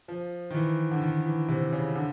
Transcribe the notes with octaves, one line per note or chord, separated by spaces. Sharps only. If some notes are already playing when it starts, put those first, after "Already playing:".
F3
D#3
E3
D3
D#3
E3
C3
C#3
D3